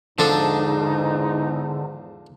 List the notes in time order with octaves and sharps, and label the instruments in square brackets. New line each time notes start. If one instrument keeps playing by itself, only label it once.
[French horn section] E2 G#2 [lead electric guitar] D3 [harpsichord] F3 D4 A4 [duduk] D#4